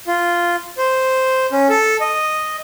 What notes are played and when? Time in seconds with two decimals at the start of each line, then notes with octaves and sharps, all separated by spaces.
0.07 F4
0.78 C5
1.52 C#4
1.69 A4
2.01 D#5